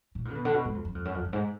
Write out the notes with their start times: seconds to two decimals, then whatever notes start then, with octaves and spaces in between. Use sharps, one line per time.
0.15 A#2
0.25 G#2
0.31 D3
0.35 B2
0.45 D3
0.54 B2
0.65 G#2
0.74 F2
0.85 F#2
0.95 F2
1.05 F#2
1.15 F2
1.25 F#2
1.33 G#2